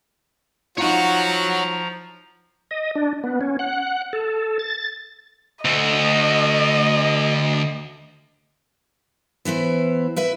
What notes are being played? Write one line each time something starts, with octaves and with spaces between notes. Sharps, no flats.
F3 D#4 F4 F#4 C#5 F#5 A#5
D#5
D4
B3
C#4
F#5
A4
A6
D2 A3 D#5
E3 B3 E4 C5
E4 B4 E5